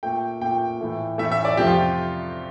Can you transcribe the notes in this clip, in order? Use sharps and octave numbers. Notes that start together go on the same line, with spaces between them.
A#2 A3 G5
A#2 A3 G5
A2 E3 A3
A2 E3 A3 E5
E5
D5
F2 C3 F3 A3 G4
F4